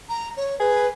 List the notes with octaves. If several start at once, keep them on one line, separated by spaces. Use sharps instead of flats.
A#5
C#5
G#4 B4